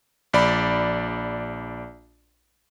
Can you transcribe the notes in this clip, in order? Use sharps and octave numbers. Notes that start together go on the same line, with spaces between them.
A#1 D5 B5